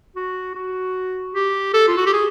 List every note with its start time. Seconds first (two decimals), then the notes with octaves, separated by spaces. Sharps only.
0.16 F#4
0.55 F#4
1.35 G4
1.74 A4
1.88 F4
1.97 F#4
2.06 G4
2.13 G#4